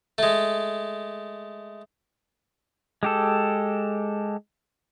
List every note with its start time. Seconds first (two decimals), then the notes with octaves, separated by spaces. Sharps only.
0.18 G#3 A3
3.03 G#3 G4 A4